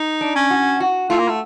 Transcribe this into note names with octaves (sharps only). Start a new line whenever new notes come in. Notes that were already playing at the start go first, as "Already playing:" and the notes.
Already playing: D#4
D4
C#4
F#4
F#4
A3 F4
A#3
A3